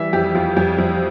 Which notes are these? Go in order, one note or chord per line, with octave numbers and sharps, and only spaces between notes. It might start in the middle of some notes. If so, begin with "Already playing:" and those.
Already playing: E3 G3 E5
F2 G4
F2 F4
F2 G4
F2